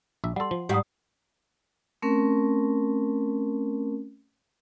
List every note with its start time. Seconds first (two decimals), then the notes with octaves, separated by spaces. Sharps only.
0.24 A#1 E5
0.36 G3 A4 F#5 C6
0.51 F3
0.69 G#2 G3 G4 F#5 D#6
2.02 A3 C4 C#4 A#4